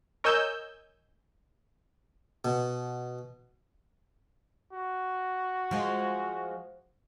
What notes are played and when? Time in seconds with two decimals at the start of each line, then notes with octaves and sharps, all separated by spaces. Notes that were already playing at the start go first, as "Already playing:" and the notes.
0.24 A#4 C#5 D#5 G#5 E6 G6
2.45 B2
4.73 F#4
5.71 F3 G#3